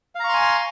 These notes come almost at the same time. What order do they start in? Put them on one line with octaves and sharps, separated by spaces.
F5 A#5 C#6 C6 G#5